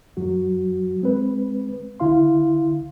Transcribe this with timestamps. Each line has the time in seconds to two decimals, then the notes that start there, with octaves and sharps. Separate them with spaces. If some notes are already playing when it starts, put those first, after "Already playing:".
0.17 F#2 F#3 F#4
1.01 G#3 C4 B4
2.00 C2 D3 E4 F5 C6